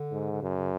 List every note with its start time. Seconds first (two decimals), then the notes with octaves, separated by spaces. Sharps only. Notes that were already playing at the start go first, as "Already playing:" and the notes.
Already playing: D3
0.11 G#2
0.32 D3
0.42 F#2 C#3
0.57 C#3